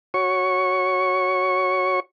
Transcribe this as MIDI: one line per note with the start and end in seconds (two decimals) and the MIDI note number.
0.14 2.00 66
0.14 2.00 73
0.14 2.00 85